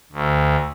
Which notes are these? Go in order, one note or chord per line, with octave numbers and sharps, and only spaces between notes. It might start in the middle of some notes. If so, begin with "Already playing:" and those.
D2